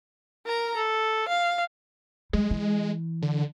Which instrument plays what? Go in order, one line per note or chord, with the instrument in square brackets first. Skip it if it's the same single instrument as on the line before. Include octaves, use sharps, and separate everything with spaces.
[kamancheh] A#4 A#5
A4
F5
[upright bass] G3 [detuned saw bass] G#3
[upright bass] E3
[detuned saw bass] D3